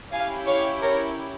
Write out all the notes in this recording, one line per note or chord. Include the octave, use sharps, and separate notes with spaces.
C#4 E4 G4 F5 G#5
C#5 F5
A#4 C#5